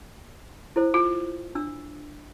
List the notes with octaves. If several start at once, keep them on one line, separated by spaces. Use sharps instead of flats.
E4 A4 C5
F4
D4 E6